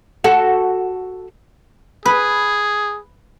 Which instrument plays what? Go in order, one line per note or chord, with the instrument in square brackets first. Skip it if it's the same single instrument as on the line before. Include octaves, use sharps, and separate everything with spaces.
[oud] F#4 A4
[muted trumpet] G#4 [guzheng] B4